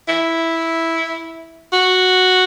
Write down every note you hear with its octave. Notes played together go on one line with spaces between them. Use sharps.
E4
F#4